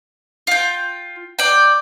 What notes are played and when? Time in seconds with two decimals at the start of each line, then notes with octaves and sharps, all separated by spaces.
0.47 F4 G5
1.39 D5 G5